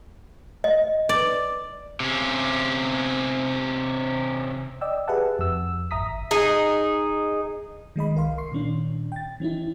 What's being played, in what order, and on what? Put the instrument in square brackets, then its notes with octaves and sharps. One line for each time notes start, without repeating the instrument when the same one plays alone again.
[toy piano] D#5
[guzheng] D5
[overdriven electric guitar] C3 C#4
[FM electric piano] D5 D#5 G5 E6
G4 G#4 B4 E5 F#5 A5
F2 E6
G#1 E5 A#5 D#6 B6
[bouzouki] D#4 G#4
[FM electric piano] D#3 G#3 D#5 B5
C2 A#4 F5 C6
C6 C#6 C7
A#2 D#3 C#4 D4
G5 A6
E3 C#4 D#4 E4